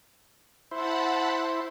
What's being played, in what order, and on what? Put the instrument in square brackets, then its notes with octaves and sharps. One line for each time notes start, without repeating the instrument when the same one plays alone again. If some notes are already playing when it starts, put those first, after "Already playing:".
[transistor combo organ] E4 C5 [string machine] F#5 A5 B5